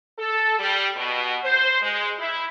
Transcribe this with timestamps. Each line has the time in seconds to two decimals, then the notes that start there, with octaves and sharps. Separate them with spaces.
0.18 A4
0.58 G3
0.96 B2
1.44 C5
1.82 G#3
2.18 E4